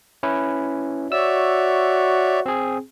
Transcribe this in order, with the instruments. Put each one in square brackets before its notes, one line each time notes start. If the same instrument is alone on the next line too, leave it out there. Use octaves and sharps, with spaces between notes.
[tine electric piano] C#4 E4 B4
[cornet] F#4 [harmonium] C#5 D5 E5 [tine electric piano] E6
[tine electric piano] C4 G#4